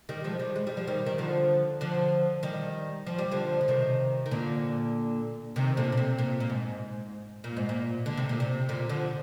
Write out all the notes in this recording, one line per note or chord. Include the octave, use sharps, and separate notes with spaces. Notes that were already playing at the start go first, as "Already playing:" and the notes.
D#3 G3
F3 G#3
D#3 G3
G#3
G3
F3
D#3 G3
D#3
D3 F3
D3 F3
D#3 G3
F3
G3
D3 F3
D3
C3 D#3
D#3
A#2 D3
C3 D#3
A#2 D3
A#2
C3
A#2
A#2
G#2
A#2
G#2
A#2
D3
C3
A#2
C3
A#2 D3
D3 F3